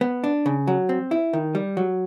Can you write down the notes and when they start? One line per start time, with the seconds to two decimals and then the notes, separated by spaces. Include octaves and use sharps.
0.01 B3
0.24 D4
0.46 C#3
0.67 F#3
0.89 C4
1.11 E4
1.33 D#3
1.55 G3
1.77 F#3